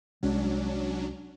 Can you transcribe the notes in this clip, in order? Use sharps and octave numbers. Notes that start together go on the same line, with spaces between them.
C2 F#3 G#3 C#4 D4